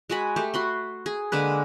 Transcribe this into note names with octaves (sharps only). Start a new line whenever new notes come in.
G#3 F#4 G#5 B5
A3 G4
F#4 B5 C6
G#4
D3 G#3 A#3 B4